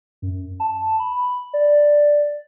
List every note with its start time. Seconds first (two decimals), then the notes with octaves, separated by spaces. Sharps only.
0.22 F#2
0.60 A5
1.00 B5
1.53 D5